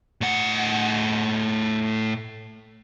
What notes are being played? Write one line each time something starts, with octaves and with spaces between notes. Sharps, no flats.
A2 F#5